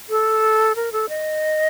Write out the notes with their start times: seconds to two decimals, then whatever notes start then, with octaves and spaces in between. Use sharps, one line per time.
0.09 A4
0.76 A#4
0.92 A4
1.09 D#5